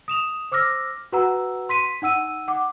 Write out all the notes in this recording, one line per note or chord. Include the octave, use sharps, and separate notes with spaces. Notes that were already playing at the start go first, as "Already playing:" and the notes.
D#6 E7 F7
C5 D6 E6 F6 A#6
F#4 B4 F#5 A#5 E6
C6 B6 D#7
D#4 F#5 E6 D#7
F#5 D6